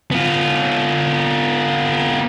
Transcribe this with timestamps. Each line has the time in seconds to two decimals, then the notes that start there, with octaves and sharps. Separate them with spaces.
0.11 B3 F4